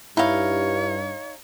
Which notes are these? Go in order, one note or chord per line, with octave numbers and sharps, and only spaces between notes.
G2 D#4 E4 C#5 F5